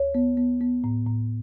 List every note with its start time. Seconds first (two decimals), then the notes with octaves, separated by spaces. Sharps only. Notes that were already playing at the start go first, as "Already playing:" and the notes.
Already playing: D2 C#5
0.15 B3
0.37 B3
0.61 B3
0.84 A2
1.06 A2